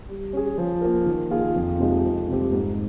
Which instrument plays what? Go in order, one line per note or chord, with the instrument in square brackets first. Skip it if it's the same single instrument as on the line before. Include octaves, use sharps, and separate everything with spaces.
[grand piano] G3
C#4 G#4
F3
A#3 F4 A#4
D#3
A#3 F4 G#4
F2
C3 F3 G#3 D#4
F2
C3 G3 C4 G4
G#2